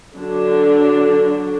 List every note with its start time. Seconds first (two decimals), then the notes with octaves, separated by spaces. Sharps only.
0.16 D3 F#3 D4